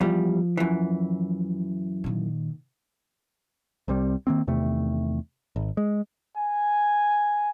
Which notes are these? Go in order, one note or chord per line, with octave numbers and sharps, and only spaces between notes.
E2 F3 G3
F#2 E3
A#2 D#3
C2 C3 G3
D#3 A#3 C4
E2 C3 D#3 A3
G#1
G#3
G#5